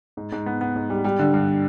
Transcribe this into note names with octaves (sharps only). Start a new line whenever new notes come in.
G#2
G#2
B3
B3
G#2
G3
G3
D3
G2